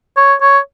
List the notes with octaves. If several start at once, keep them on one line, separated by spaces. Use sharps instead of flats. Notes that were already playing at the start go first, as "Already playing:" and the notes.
C#5
C#5